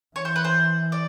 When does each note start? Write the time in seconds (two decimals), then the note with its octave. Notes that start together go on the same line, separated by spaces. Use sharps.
0.16 E3 C#5
0.25 C5
0.36 B4
0.44 C5
0.92 D5